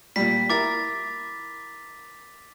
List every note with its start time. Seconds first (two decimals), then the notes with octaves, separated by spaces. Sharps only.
0.16 A#2 G3 B6
0.50 E4 A#4 D6 A6